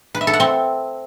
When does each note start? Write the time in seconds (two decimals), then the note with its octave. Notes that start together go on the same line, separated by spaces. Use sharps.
0.15 B4
0.21 E5
0.27 A4
0.33 F#5
0.40 C4